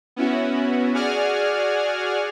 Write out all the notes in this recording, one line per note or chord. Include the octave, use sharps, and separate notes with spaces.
B3 C#4 E4 F#4
F#4 G#4 D5 F#5 G#5 F6